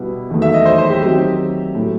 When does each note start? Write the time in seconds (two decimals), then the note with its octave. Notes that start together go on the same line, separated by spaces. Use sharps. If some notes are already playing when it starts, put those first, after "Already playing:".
Already playing: B2 G3 B3 E4
0.30 E2 D#3 F#3 A3
0.42 E5
0.54 D#5
0.65 C5
0.78 C5
0.90 G4
1.02 D#3 F#3 C4 D#4 G4
1.75 A2 F#3 A3